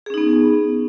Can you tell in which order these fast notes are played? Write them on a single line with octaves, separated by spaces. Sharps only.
G#4 C#4 D#4 B3